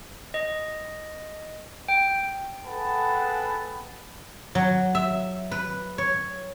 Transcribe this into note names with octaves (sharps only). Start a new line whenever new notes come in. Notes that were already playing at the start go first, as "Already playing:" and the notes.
D#5
G5
G#4 A4 B4 F#5 G5 A5
F#3
E5
B4
C#5